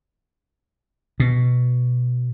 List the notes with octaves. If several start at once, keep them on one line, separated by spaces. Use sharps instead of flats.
B2